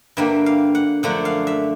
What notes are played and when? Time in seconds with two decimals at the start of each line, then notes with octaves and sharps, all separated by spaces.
0.17 G2 D3 G3 A#3 E5
0.46 F5
0.75 F#5
1.03 F#2 D3 F3 A3 D4 F#5
1.25 F5
1.47 E5